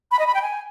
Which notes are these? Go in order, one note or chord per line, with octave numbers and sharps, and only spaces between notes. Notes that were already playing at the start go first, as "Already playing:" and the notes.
B5
D#5
B5
G5
G#5